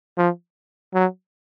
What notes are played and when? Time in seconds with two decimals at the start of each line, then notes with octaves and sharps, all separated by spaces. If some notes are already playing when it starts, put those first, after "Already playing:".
0.18 F3
0.94 F#3